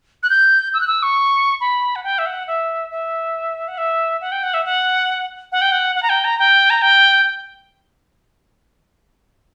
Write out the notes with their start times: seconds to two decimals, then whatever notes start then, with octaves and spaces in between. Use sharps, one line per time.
0.23 F#6
0.30 G6
0.74 E6
0.81 F#6
0.87 E6
1.03 C#6
1.60 B5
1.96 F#5
2.04 G5
2.18 E5
2.26 F#5
2.47 E5
2.91 E5
3.68 F#5
3.78 E5
4.21 F#5
4.32 G5
4.43 F#5
4.54 E5
4.65 F#5
5.52 F#5
5.61 G5
5.72 F#5
5.96 F#5
6.03 A#5
6.09 G5
6.24 A#5
6.39 G5
6.70 A#5
6.82 G5